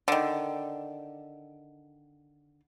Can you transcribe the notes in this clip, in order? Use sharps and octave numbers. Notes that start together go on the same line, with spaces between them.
D3 D#3